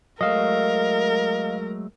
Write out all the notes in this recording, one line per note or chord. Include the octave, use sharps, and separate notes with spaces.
F#3 G#3 A3 A#4 D#5 F5